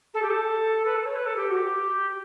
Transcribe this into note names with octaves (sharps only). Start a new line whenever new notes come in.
A4
G4
A4
B4
A4
C#5
B4
A4
G4
F#4
G4